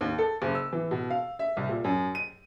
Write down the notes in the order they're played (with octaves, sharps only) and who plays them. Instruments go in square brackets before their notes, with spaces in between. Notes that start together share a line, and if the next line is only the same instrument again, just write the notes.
[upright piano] D#2
A4
F#1
E6
E3
B2
F5
E5
C2
A#2
F#2
D#7